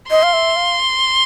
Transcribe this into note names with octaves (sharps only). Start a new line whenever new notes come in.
D#5 C6
F5
E5
F5